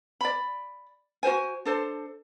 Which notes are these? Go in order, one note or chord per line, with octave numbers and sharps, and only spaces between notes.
D5 B5
F#4 A#4 C5 G#5
D4 A4 C5